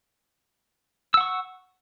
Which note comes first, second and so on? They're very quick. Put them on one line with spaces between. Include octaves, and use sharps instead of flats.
E6 F#5 C#6